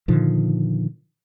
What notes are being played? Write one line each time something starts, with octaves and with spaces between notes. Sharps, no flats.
A#2 D3 D#3 F3